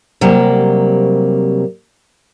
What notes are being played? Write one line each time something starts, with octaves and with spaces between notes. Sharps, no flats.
C3 F#3 G3 A#3